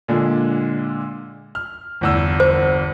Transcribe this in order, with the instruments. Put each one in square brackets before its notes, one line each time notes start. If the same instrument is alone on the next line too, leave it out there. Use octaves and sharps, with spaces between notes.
[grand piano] A#2 D3 G#3
F6
G1 E2 E6
[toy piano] C5